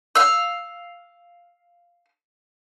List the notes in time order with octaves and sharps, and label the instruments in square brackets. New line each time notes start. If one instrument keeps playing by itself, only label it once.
[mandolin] F5 E6